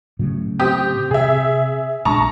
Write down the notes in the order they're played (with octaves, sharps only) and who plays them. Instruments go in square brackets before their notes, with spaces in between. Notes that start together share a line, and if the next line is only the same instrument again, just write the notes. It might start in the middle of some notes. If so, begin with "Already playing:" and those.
[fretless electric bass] A2 C#3 F#3
[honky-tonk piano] C4 G4 D#6
[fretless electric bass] C3 [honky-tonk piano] G#4 E5
[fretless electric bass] A#1 G#3 D4 [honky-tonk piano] A5 A#5 C#6